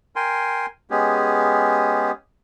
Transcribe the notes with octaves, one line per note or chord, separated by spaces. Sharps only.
A#4 G5 G#5 C6
G#3 B3 C#4 G4 G#4